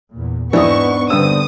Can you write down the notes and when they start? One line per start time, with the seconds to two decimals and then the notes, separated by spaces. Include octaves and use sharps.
0.13 E2 A#2
0.53 G#2 E3 B3 C4 D4 D#4 C#6 D#6
1.10 G2 D3 B3 C4 D#6 E6